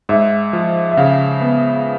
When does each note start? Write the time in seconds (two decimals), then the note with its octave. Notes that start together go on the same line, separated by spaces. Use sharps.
0.09 G#2 E5
0.53 F3
0.91 E5
0.97 C#3 F5
1.41 B3